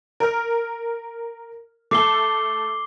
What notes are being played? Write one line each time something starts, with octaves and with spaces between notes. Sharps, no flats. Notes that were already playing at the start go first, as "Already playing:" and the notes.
A#4 F6
A3 A4 D6 C7 G7